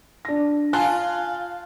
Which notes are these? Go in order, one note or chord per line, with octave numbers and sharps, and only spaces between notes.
D4 A#6
F4 G#5 A5 F#6